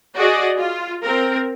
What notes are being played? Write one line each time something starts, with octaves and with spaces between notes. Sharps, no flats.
F#4 G#4 D5 D#5
F4
C4 A#4